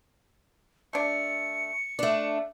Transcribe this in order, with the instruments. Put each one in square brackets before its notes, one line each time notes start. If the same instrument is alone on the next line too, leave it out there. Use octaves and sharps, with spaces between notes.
[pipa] A3 D4 [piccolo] C#7
[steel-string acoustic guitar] A3 D4 [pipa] D5